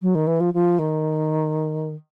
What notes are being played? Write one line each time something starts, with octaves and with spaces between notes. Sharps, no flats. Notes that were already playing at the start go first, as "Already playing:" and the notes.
F#3
D#3
E3
F3
F3
D#3